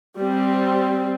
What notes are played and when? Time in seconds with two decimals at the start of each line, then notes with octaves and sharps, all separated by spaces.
0.19 G3 C4